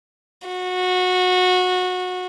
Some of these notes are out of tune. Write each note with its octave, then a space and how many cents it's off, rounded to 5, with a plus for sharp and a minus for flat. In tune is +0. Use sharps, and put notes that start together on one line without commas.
F#4 -20